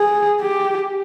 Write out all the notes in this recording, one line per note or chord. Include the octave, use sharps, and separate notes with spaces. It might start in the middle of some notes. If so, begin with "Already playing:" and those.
Already playing: G#4
G4